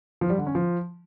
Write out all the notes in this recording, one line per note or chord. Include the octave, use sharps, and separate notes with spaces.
F3
G3
D3
C#4
F3